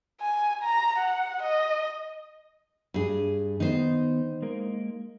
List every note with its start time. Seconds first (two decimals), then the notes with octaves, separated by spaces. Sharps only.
0.21 G#5
0.63 A#5
0.98 F#5
1.43 D#5
2.94 G2 G#4
3.60 D#3 B3 D#4 C5
4.42 G#3 A#3 A#4